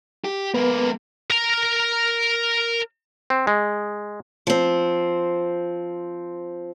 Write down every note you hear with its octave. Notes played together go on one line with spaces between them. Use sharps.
G4
G#3 A#3 B3 B4
A#4 A#5
C4
G#3
F3 C4